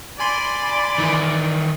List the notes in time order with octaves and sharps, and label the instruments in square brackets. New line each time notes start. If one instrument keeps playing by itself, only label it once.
[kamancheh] D5 [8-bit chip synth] G#5 B5 C6
[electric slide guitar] D#3 E3 E4